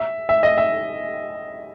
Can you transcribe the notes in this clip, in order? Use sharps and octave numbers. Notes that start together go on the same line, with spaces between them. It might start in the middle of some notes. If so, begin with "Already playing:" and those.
Already playing: E5
E5
D#5
E5